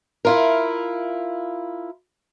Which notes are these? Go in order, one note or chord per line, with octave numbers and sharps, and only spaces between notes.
E4 F4 A#4